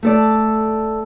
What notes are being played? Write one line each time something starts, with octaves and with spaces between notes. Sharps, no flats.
A3 A4 D5